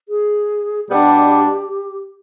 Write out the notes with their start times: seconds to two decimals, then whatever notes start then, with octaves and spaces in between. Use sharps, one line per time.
0.09 G#4
0.88 B2 G3 B3 D4 G4